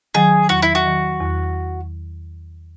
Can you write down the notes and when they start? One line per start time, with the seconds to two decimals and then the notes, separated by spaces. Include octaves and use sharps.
0.14 D#3 F#3 G#4
0.49 E2 F#4
0.62 E4
0.75 F#4
0.85 D#3 F#3
1.20 E2